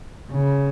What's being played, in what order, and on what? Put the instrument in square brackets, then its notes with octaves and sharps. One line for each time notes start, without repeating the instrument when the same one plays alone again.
[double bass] C#3